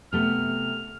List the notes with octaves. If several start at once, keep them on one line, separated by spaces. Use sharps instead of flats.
C3 A3 B3 F6